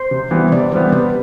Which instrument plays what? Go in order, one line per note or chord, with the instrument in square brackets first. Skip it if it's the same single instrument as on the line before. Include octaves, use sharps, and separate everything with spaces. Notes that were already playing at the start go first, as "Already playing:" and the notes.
Already playing: [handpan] C5
[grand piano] C3
E3 G3 B3
[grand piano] C3 [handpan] D5
[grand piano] E3 G3 B3 [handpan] C5
[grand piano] C3 [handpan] B4